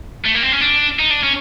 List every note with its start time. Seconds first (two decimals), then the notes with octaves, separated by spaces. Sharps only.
0.25 A3
0.34 A#3
0.42 C4
0.52 C#4
0.61 D4
0.99 D#4
1.11 D4
1.23 C#4